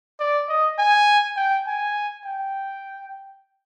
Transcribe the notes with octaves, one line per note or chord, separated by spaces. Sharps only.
D5
D#5
G#5
G5
G#5
G5